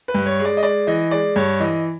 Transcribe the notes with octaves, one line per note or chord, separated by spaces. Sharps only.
B4
G2
C#5
G#3
D5
D#5
G#3 D5
E3 D#5
G#3 D5
G2 C#5
E3 D#5